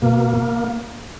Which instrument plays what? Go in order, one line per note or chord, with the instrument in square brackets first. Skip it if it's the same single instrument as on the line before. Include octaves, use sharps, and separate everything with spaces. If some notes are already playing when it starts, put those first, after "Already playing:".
[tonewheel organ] B2 A#3